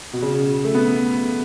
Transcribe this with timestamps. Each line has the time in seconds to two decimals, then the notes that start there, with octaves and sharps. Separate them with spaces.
0.13 B2
0.22 C#3
0.64 A3
0.74 B3